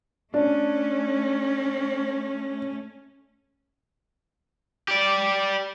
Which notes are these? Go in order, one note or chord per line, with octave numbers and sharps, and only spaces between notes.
A3 C#4 D4
G4 D5